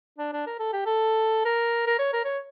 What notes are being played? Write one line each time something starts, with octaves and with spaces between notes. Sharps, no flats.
D4
D4
A#4
A4
G4
A4
A#4
A#4
C#5
A#4
C#5